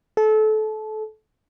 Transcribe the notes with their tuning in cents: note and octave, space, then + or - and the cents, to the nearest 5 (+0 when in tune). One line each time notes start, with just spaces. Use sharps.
A4 -25